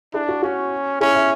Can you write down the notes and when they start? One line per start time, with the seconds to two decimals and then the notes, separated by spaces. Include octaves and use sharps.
0.14 D4 E4 G#4
0.29 F#4
0.42 C#4 F#4
1.00 C#4 E4 G#4
1.15 C#5 E5